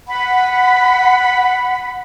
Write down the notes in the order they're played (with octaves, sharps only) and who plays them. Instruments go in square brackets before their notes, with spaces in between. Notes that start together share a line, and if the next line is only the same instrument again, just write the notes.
[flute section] F#5 B5